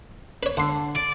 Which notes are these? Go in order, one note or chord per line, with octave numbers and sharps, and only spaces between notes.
B4 C#5
D3 F#5 C6
D5